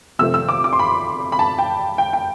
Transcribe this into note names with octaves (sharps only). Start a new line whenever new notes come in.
C3 F3 A3 C4 E6
E6
D6
D6
C6
B5
B5
A5
G5
G5
G5